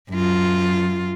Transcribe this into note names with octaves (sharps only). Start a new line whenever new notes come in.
F#2 F4